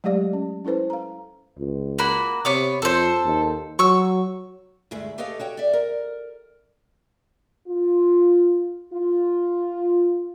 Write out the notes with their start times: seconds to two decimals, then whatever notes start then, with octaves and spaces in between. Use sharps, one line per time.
0.04 F#3 G#3 A3 G4 D5 F5
0.33 C#4
0.65 C#4 E4 A4 B4 C5
0.90 F5 A#5
1.58 C#2
1.99 A#3 F#4 B5
2.45 C3 B3 C#5 D6
2.82 F2 A4 C5
3.25 D#2
3.79 F#3 C#6 E6
4.91 D2 G2 G#3 A3 E5
5.18 G4 A4 B4 C#5 D#5 F5
5.40 F#4 C#5 G5
5.57 D5 E5
5.73 A#4
7.68 F4
8.93 F4